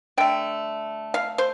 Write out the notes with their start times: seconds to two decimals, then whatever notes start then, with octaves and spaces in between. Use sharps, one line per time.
0.17 D3 A3 G5
1.14 F5
1.38 C5